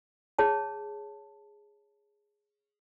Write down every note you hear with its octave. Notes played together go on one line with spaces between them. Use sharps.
G#4 C#5 A5